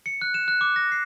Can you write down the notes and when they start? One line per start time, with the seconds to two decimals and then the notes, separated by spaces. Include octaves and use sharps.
0.06 C#7
0.21 F#6
0.34 E7
0.48 F#6
0.61 D6
0.76 A#6
0.92 C7